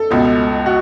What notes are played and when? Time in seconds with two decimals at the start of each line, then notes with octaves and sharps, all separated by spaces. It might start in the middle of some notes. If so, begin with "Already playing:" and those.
Already playing: A4
0.11 C#2 B2
0.66 F#4